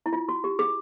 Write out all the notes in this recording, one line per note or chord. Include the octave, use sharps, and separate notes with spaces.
E4
F4
F#4
G4
G#4